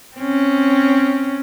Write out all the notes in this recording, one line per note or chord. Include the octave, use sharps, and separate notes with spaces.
C4 C#4